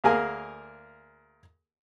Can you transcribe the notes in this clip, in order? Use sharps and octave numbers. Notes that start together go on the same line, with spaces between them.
D2 A#3 G#4 A#4 F5 G#5